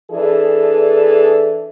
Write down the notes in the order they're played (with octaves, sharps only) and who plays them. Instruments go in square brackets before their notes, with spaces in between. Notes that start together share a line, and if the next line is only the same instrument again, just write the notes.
[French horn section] E3 D4 G#4 A4